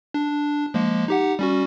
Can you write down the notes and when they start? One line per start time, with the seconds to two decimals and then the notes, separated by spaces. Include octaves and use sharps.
0.14 D4
0.74 F3 G#3 A#3
1.08 D#4 G4 F#5
1.39 G3 C#4 F#4